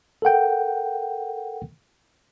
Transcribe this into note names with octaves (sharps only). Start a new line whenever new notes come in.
A4 A#4 F#5 G5